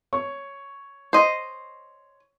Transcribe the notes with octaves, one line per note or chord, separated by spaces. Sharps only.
C#5 C#6
C5 D#5